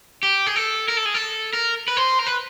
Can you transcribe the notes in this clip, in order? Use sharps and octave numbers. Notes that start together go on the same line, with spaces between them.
G4
G#4
A4
A#4
A4
G#4
A4
A#4
B4
C5
A#4
B4